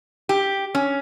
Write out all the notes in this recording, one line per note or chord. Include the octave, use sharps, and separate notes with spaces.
G4
C#4